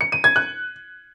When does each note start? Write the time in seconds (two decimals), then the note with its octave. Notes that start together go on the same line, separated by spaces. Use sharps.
0.01 C#7
0.12 D#7
0.24 G#6
0.36 F#6